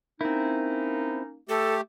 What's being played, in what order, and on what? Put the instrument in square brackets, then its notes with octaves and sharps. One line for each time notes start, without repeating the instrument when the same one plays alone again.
[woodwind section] A#3 C#4 D#4 [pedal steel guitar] C4 E4
[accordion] A3 G4 [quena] A4